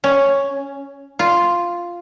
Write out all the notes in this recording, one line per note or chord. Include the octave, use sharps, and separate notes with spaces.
C#4
F4